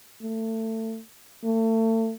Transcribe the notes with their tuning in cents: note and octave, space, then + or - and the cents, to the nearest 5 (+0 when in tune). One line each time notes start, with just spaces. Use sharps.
A3 +25
A3 +35